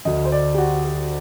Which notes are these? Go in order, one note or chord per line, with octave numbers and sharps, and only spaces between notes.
D2 D3 D#5
C5
D5
G4
F#4
G4